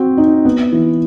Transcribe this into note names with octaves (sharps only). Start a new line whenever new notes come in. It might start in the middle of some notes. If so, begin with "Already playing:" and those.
Already playing: C4 F#4
D#4
B3
E3